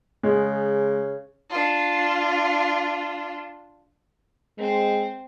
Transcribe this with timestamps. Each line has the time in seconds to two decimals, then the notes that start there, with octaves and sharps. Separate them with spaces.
0.23 C#3 G#3
1.50 D4 F4
4.58 G#3 C4 C5